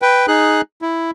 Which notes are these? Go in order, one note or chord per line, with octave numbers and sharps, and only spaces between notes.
B4 G5
D#4 G#4 F#6
E4